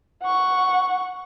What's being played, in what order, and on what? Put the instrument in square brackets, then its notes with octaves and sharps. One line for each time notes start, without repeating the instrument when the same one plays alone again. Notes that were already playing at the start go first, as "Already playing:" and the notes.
[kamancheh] F#5 C#6